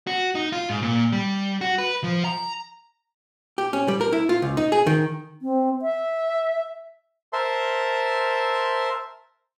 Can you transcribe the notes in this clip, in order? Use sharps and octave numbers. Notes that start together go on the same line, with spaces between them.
F#4
D#4
F4
G#2
A#2
G3
F#4
B4
F3
A#5
G4
C#4
G3
A#4
E4
F4
C#2
D#4
G#4
D#3
C4
E5
A#4 C5 E5 A5 C6